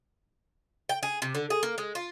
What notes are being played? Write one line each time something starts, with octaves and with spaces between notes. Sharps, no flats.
G5
G#4
C3
D3
G#4
A#3
G#3
F4